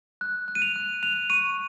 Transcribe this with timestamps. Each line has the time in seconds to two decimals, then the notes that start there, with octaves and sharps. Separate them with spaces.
0.21 F#6
0.48 F#6
0.55 D#7
0.62 F7
0.76 F#6
1.03 F#6 F7
1.30 C#6 D#7